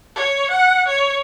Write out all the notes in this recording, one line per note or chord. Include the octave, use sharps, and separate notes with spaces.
C#5
F#5
C#5